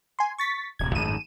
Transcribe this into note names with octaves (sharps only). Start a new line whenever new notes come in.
G#5 C6
C#6 A6 B6
D1 C3 G#6
G#1 F#2 A2 D#7 E7